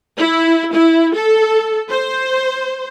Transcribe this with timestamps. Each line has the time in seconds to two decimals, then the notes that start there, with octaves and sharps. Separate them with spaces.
0.18 E4
0.72 E4
1.15 A4
1.90 C5